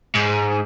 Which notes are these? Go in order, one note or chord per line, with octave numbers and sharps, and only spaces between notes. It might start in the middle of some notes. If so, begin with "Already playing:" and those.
G#2